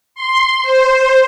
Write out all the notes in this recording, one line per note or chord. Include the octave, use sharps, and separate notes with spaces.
C6
C5